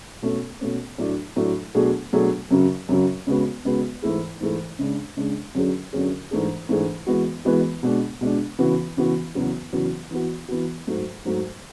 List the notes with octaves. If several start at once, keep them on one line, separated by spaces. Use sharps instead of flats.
B2 A3 C#4
B2 A3 C#4
A2 F#3 A3 D4
A2 F#3 A3 D4
B2 F#3 A3 D4 G#4
B2 F#3 A3 D4 G#4
F#2 C#3 F#3
F#2 C#3 F#3
C#3 G#3 B3 F#4
C#3 G#3 B3 F#4
G#2 E3 A3 E4 G#4
G#2 E3 A3 E4 G#4
C#3 G#3 D4
C#3 G#3 D4
F#2 D3 F#3 C#4 G#4
F#2 D3 F#3 C#4 G#4
G#2 E3 A3 D4 G#4
G#2 E3 A3 D4 G#4
E3 G#3 B3 F#4
E3 G#3 B3 F#4
B2 G#3 D4
B2 G#3 D4
C#3 E3 B3 F#4
C#3 E3 B3 F#4
E2 C#3 F#3 B3 F#4
E2 C#3 F#3 B3 F#4
E3 B3 F#4
E3 B3 F#4
G#2 F#3 A3
G#2 F#3 A3